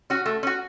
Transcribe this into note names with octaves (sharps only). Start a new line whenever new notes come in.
C#4 F#4
A3
C#4 F#4